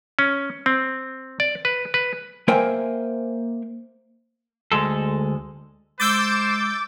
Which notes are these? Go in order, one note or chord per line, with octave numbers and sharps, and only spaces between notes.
C#4
C4
D5
B4
B4
A#3 A#4 C5 E5 G5 G#5
D2 G#3 A4
G#3 C5 D6 E6 G6 A6